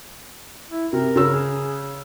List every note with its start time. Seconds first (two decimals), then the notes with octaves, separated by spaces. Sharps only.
0.70 E4
0.93 C3 A#4
1.16 C#3 E6
1.33 G#4